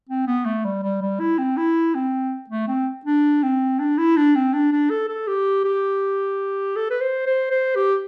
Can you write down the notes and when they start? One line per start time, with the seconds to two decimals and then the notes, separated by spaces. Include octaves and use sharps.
0.09 C4
0.27 B3
0.45 A3
0.64 G3
0.83 G3
1.01 G3
1.20 E4
1.38 C4
1.57 E4
1.94 C4
2.49 A3
2.67 C4
3.05 D4
3.43 C4
3.79 D4
3.98 E4
4.16 D4
4.35 C4
4.53 D4
4.72 D4
4.90 A4
5.09 A4
5.27 G4
5.64 G4
6.76 A4
6.90 B4
7.00 C5
7.26 C5
7.50 C5
7.75 G4